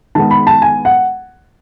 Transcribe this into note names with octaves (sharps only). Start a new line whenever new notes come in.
D#3 G#3 B3 A5
B5
A5
G#5
F#5